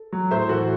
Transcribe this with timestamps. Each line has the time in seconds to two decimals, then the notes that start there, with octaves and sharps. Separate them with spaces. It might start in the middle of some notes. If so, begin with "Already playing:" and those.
Already playing: A4
0.13 F#3
0.31 A2 C5 E5
0.49 E3 F#4 A4